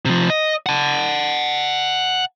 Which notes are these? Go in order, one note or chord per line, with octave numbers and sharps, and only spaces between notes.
C3 F3
D#5
F#5 A5